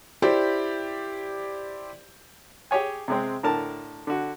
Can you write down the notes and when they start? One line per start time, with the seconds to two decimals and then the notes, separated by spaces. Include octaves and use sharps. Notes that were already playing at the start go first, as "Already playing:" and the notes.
0.22 E4 G4 C5 D5
2.71 G4 G#4 C#5 G#5
3.08 C3 G#3 C4
3.43 A2 D3 A#4 A5
4.07 D3 F#4